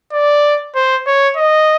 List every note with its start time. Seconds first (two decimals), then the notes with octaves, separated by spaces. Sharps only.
0.12 D5
0.75 C5
1.07 C#5
1.37 D#5